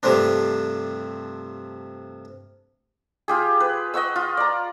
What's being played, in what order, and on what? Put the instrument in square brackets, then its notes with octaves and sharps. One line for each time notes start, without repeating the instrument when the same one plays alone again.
[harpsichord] G2 C3 F3 A3 C4 D4
[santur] F4 G4 G#4
B4
D#5 F#5 C#6 E6
F4
D5 A#5